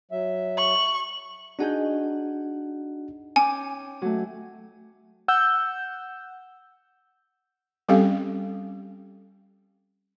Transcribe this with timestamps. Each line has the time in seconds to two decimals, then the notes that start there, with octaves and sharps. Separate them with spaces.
0.11 F#3 E5
0.58 C#6 F#7
1.59 D4 D#4 F#4 G#4 F#5 G6
3.36 C#4 G5 G#5 D6
4.02 F#3 A3
5.28 F#5 E6 G6
7.89 G3 C4 C#4 G4 A4 F5